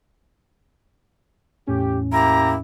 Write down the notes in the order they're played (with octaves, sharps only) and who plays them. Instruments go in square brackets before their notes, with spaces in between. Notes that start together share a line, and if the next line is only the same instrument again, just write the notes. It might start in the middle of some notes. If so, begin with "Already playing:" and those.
[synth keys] E2 A2 C#4 [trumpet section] G4
[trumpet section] A#3 E4 G4 [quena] A#5